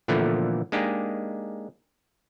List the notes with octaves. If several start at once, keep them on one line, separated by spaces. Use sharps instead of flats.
A#2 D3 E3 F3 A3 B3
G#3 A#3 D4 D#4 G4 G#4